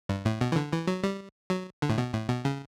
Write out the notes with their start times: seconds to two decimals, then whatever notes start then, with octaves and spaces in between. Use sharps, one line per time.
0.09 G2
0.25 A2
0.41 B2
0.52 E3
0.56 D3
0.72 E3
0.87 F#3
1.04 G3
1.50 F#3
1.82 D3
1.90 A2
1.98 B2
2.13 A2
2.29 B2
2.45 C#3